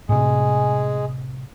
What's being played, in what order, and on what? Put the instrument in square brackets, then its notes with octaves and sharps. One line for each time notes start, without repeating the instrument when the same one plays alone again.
[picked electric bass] A2 C3 [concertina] G#3 G#4